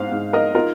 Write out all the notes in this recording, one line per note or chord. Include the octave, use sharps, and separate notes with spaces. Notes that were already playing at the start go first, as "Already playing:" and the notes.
Already playing: G#2 C5 F5
G#2
A#4 D#5
D#4 F4 A#4